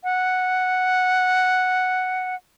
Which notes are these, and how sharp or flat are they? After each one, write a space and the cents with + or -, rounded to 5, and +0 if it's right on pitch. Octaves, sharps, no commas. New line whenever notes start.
F#5 +0